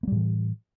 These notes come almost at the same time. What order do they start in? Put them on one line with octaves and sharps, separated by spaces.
A#3 G3 A2 E3